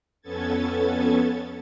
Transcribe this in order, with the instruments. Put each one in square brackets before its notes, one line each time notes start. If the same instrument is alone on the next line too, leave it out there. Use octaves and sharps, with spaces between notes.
[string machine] F2 B3 C#4 A4 G#6 A6